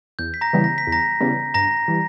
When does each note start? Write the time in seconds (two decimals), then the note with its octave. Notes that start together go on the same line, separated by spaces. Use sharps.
0.19 E2 G6
0.34 B6
0.41 A#5 A#6
0.53 C#3 E3 G3 B3
0.64 A#6
0.78 B6
0.87 E2
0.92 A#5 A#6
1.20 C#3 E3 G3 B3
1.54 G2 A#5 A#6
1.88 E3 G3